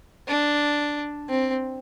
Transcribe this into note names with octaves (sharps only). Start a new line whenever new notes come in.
D4
C4